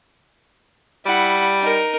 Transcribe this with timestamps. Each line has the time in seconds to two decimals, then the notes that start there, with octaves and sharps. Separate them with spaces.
1.06 G3 E4 F#5
1.60 D#4 A#4